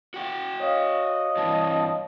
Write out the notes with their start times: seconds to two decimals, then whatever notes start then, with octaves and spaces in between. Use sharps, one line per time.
0.14 F#4 G5
0.60 C#5 D#5 F5
1.36 G2 E3 A5